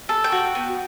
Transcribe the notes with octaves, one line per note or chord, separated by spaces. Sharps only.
A4
G5
F#4
B3